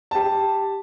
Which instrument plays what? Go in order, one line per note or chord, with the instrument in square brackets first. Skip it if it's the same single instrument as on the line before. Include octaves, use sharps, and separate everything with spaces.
[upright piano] G4 A5